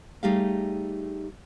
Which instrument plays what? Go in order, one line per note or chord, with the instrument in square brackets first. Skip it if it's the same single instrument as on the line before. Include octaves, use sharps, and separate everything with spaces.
[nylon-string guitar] G3 A3 D#4 G4 G#4 F5